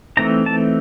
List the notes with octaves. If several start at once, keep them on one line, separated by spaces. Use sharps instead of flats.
E3 A3 C4 D#4 A#5
A5